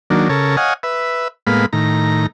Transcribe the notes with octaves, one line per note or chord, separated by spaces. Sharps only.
D#3 F#3 A#3 D4
C#3 A4 A#4 C#5
C#5 D#5 F5 F#5 G#5
B4 E5
A2 G#3 A#3 B3 F5 B5
A2 D#3 A#5